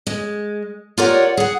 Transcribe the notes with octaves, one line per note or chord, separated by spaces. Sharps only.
G#3
F4 G4 A#4 C#5 D5 F#5
G#4 F#5